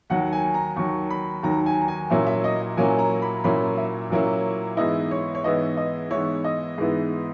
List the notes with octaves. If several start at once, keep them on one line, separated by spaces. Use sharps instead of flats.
D#2 D#3 F#3 F#5
G#5
A#5
D#2 D#3 F#3 C#6
B5
D#2 D#3 F#3 A#5
G#5
A#5
G#5
A#2 F#3 A#3 C#4 E4 E5
E5
D#5
A#2 F#3 A#3 C#4 E4 G#5
A#5
B5
A#2 F#3 A#3 C#4 E4 B5
E5
A#2 F#3 A#3 C#4 E4
G#2 E3 B3 E4 D#5
C#5
C#5
G#2 E3 B3 E4 D#5
D#5
G#2 E3 B3 E4 C#5
D#5
G#2 E3 B3 E4